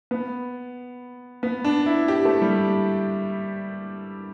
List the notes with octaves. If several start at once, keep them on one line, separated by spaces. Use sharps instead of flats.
B3
B3
D4
E4
G4
A3
G3